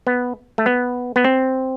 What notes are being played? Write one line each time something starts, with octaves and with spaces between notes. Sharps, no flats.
B3
A3
B3
B3
C4